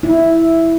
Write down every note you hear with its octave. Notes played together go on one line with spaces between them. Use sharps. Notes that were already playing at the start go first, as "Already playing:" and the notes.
E4